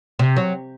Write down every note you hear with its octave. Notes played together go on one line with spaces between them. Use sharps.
C3
F#3